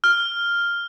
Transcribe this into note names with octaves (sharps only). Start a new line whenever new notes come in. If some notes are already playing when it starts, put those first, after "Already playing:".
F6